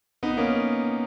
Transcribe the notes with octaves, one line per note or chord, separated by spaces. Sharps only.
B3 D#4
A#3 C#4